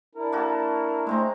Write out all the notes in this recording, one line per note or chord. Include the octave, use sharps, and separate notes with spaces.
D4 E4 A#4
A#3 F#4 A4
G#3 A3 C4 A#5